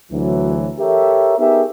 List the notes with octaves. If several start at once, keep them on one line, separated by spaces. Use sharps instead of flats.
D2 E3 F#3
G4 A4 A#4 C#5 E5
B3 D#4 G4 G#4 A#4 E5